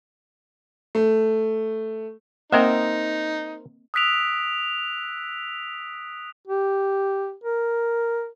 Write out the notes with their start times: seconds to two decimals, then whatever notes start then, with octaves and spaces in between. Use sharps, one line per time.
0.95 A3
2.52 A#3 C4 D#4 A#4 C5 D#5 E5
3.94 D#6 E6 F#6 B6 D7 F7
6.47 G4
7.44 A#4